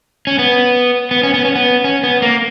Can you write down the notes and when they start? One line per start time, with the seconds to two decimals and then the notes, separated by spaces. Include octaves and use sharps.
0.27 C#4
0.39 B3
1.11 B3
1.23 C#4
1.34 B3
1.45 C#4
1.55 B3
1.84 C#4
2.03 B3
2.22 A#3